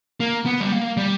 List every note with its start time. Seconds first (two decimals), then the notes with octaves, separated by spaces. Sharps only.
0.20 A#3
0.46 B3
0.60 G3
0.72 A#3
0.97 G3